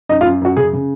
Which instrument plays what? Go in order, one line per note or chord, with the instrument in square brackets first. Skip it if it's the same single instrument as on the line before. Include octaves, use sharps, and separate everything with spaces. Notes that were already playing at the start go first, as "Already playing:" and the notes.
[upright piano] F#2 D#4 D#5
F4 F5
F#2
F#2 F#4
C#3 G#4
C#3